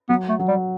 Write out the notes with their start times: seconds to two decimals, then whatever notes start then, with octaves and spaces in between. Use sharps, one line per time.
0.09 F#3 B3
0.29 A3
0.39 F#3
0.48 G3